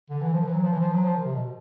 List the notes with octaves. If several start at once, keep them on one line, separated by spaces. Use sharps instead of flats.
D3
E3
F3
D#3
E3
F#3
F3
E3
F3
F#3
F3
D#3
C3
B2